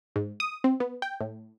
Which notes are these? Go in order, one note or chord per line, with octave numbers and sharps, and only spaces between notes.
G#2
D#6
C4
B3
G5
A2